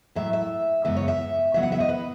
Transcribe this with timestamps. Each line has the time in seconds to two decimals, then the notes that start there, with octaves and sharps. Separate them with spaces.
0.15 A2 F#3 A3 E5
0.33 E5
0.85 F#2 C#3 G#3 B3 E5
0.96 C#5
1.08 E5
1.54 C#3 F#3 B3 E5
1.63 F#5
1.72 E5
1.80 D#5
1.89 B4